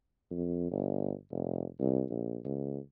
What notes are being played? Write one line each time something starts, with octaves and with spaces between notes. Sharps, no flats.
F2
G1
F1
C2
A#1
C#2